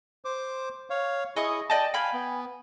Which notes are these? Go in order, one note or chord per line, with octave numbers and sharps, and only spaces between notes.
C5 D6
C#5 F5
E4 G#4 D#5 C#6 D#6
D5 D#5 G5 A5
F5 G5 G#5 B5
B3